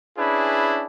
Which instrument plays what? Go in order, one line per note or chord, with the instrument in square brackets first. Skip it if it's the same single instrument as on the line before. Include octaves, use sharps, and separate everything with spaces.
[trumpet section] C#4 D4 E4 G#4 B4